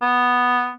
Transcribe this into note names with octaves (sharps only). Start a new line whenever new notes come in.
B3